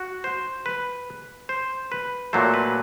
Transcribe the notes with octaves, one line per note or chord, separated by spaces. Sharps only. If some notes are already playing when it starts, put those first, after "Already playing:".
Already playing: F#4
C5
B4
C5
B4
A#2 F#3 A3 C5
B4